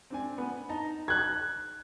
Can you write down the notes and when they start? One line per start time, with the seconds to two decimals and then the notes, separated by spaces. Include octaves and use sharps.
0.10 C4 D4 G#5
0.38 B3
0.69 D#4 A5 A#5
1.08 F#6 G#6